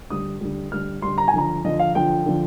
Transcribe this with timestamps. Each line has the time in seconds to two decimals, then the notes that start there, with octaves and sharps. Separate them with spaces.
0.10 D3 G3 D#6
0.41 D3 G3
0.72 D3 G3 F6
1.02 D3 G3 C6
1.18 A#5
1.28 G#5
1.34 D3 F3 A#5
1.65 D3 F3 D#5
1.79 F5
1.95 D3 F3 G5
2.26 D3 F3